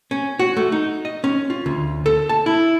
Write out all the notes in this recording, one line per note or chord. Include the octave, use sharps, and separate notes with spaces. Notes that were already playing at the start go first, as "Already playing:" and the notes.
C#4
F#4
A3
D#4
D#5
C#4
F4
D2
A4
A5
E4